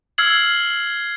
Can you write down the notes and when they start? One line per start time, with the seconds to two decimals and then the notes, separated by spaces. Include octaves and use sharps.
0.18 E6 F6 G#6 C7 F#7